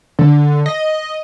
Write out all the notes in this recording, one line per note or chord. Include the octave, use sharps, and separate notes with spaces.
D3
D#5